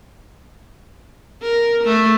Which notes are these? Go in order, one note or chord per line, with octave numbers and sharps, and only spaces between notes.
A#4
A3